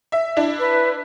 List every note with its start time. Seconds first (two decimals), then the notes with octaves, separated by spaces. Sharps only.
0.12 E5
0.37 D4 E4
0.59 B4